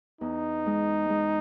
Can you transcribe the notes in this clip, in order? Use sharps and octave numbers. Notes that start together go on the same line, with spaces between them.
E2 D#4
G#3
G#3